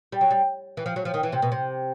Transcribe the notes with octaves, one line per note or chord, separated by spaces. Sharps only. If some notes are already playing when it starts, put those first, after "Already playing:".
G3
F#3
G3
E3
F3
F#3
F3
D#3
E3
C3
B2
C3